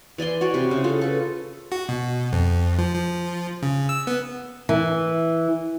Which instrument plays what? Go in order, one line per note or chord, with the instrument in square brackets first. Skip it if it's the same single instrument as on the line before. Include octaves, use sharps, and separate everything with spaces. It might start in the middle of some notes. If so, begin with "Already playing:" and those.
[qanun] E3 D5 G#5 C6
F#4 C#5 D5
C3 E4
C#3
F4 A4
A4 B4
[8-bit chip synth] F#4
B2
F2
F3
F3
C#3
E6
B3
[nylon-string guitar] E3